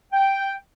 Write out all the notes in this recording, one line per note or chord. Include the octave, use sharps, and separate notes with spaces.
G5